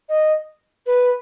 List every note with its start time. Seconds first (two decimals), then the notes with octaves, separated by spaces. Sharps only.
0.09 D#5
0.87 B4